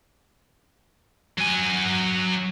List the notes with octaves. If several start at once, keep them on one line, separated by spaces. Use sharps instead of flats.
F#3 G#5